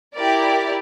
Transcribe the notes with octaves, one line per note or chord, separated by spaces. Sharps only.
E4 G4 A#4 D5